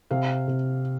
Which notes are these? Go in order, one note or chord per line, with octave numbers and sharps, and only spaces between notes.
C3 F5
C3